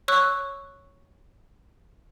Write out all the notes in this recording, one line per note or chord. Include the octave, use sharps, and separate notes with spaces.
C#5 C#6 E6 F#6